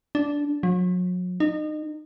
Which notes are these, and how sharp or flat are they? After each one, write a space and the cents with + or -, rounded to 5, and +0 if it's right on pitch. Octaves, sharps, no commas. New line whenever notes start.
D4 -10
F#3 -40
D#4 -30